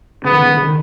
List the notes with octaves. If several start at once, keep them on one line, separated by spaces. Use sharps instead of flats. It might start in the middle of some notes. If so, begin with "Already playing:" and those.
C#3 B3
D#3
C#3
D#3
C#3
D#3